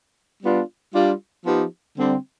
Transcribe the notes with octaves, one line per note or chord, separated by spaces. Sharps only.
G3 B3 D4 F4
G3 D4 F4
F3 B3 D#4 G4
D3 G3 C4